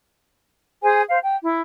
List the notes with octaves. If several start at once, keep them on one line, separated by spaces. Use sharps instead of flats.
G#4 C5 G#5
C5 F5
G5
E4